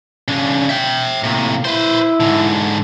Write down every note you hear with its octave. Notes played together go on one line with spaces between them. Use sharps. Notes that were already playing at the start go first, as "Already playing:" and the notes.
C#3 D4
E5 G5
A2 C3 A#3
E4 B4 C5
G#2 D3